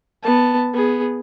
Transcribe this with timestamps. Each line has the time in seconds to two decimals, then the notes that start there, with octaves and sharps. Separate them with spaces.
0.23 B3 A5
0.73 B3 G#4